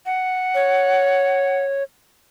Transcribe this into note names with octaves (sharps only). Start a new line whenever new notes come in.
F#5
C#5